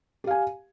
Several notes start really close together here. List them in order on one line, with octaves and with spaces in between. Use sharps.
G4 F5 G#5